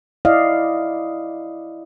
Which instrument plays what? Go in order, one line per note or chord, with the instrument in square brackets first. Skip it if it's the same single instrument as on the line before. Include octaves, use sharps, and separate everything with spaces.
[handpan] E4 D5 D#5 F5